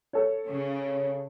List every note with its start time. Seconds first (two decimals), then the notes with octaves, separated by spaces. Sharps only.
0.13 A4 C#5
0.48 C#3